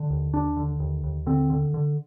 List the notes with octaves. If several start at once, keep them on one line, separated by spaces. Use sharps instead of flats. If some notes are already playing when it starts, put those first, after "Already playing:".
Already playing: D3
D#2
D#2 D4
D3
D#2
D#2
D3 C4
D3
D3